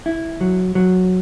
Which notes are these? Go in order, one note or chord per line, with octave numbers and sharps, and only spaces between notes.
E4
F#3
F#3